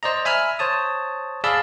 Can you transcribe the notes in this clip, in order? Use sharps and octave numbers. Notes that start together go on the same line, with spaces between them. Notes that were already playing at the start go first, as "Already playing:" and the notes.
C5 D5 D#5 A#5
E5 G#5 B5 E6 F6
C5 C#5 A5 D#6
G#4 D5 F5 A5 B5 E6